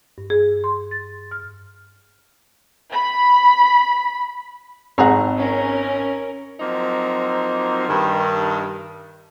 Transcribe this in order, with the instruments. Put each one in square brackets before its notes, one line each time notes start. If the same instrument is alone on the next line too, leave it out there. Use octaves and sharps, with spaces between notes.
[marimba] G2
G#4
C6
A6
F6
[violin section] B5
[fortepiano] G#1 A#5 [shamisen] C4 G#4 F#5
[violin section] C#4 A#4
[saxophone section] F3 F#3 A#3 C4 D#4
G2 D#3